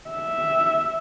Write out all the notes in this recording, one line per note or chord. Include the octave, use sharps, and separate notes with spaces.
E5